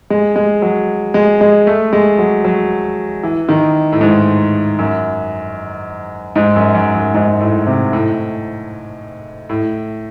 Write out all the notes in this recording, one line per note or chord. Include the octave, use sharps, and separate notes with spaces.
G#3
G#3
F#3
G#3
G#3
A3
G#3
F#3
F#3
E3
D#3
A2
G#2
F#2
G#2
F#2
F#2
F#2
G#2
A2
C3
A2
A2